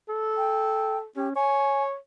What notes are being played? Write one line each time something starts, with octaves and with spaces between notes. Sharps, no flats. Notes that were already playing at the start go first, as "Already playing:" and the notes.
A4
G5
C#4 G4
C#5 G#5